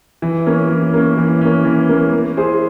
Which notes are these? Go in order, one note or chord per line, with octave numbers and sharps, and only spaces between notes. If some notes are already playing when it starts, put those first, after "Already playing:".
E3
A#3 C#4
E3
A#3 C#4
E3
A#3 C#4
E3
A#3 C#4
A#3
E4 G#4 C5